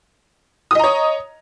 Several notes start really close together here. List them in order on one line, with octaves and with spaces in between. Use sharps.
D#6 D#5 A#5 C#5